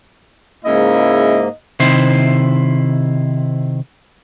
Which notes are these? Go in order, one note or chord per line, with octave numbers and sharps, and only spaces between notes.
G#2 C#3 G#3 A#3 E4 D#5
C3 D#3 E4 C5